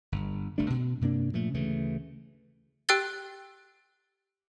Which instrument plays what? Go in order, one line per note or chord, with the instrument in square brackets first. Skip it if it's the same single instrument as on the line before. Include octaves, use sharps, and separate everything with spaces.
[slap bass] G1
G1 G2 A3 D4
B2
G2 C3 A#3 D4
A#2 F3 A3
D2 C#3 E3 A3
[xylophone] G4 G5 E6 F#6 A6 G7